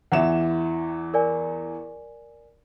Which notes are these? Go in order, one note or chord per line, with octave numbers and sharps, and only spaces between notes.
E2 E3 E5 F#5 E7
A#4 D5 G#5